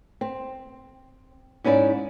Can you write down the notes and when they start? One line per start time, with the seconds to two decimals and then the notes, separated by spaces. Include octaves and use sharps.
0.21 C4
1.64 G#2 C#4 E4 A#4 D5